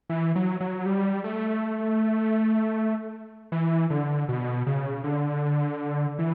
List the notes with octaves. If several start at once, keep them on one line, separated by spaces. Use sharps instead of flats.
E3
F#3
F#3
G3
A3
E3
D3
B2
C#3
D3
E3